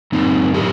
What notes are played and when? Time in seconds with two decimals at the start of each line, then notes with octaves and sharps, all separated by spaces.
0.12 F#2 C4 D#4
0.54 A2 G4 A#4